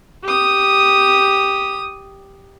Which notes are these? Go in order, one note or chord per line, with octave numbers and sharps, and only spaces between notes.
G4 D#6